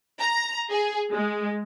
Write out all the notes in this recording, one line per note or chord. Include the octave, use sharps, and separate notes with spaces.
A#5
G#4
G#3